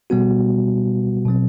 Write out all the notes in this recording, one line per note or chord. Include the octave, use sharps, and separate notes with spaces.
B2 G3 B3 F#4
B2 F#3 C4